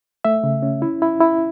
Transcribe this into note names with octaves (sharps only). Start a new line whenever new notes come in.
A3 E5
C#3
C#4
E4
E4
E4